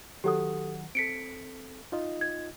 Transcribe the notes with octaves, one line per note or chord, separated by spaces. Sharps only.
D#3 F#3 G4 A4 F#5 D#6
C4 A4 B6 C#7 D7
D#4 F4 D#5
G#6